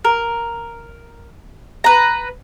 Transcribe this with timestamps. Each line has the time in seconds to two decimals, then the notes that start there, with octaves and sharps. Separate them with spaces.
0.05 A#4
1.84 B4 A#5